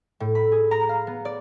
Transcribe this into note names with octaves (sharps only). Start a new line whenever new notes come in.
A2
B5
G#4
A#5
F5
B3
D5